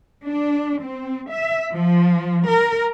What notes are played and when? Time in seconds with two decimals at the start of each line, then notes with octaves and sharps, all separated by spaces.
0.24 D4
0.80 C4
1.31 E5
1.71 F3
2.46 A#4